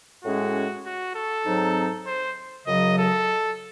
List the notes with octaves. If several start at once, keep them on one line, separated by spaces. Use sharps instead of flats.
A2 G#3 C#4 F#4 G#4
F#4
A4
G#2 F#3 C4 D#4
C5
F#2 C#3 F#3 D#5
A4